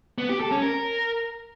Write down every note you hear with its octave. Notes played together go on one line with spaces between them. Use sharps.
B3
G4
A4
C#4
A#4